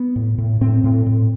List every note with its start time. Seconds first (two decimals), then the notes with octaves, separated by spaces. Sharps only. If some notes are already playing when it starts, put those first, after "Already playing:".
Already playing: B3
0.16 A2
0.38 A2
0.61 A2 C4
0.84 A2
1.06 A2